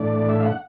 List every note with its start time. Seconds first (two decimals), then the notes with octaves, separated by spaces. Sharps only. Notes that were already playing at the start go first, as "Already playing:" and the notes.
Already playing: A2 E3 A3 D4 D5
0.29 E5
0.40 F5
0.45 F#5